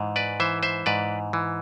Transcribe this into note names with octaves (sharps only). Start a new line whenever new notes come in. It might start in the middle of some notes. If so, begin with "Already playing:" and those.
Already playing: G#2 E3
B4 D5
E3 C5 E5
C5 E5
G#2 B4 D5
E3